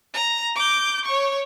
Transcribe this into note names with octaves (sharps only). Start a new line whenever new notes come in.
A#5
D6 G6
C#5 C#6